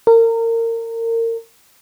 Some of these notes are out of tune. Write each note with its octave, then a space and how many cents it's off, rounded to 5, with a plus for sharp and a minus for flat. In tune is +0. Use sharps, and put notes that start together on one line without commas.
A#4 -30